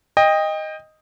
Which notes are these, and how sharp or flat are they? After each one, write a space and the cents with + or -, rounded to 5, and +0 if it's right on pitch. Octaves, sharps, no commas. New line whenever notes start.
D#5 +0 G5 +25